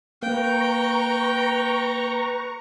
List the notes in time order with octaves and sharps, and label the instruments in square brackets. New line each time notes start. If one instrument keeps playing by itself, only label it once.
[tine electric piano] A#3 [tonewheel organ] B4 [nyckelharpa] G5 [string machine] A#5 C#6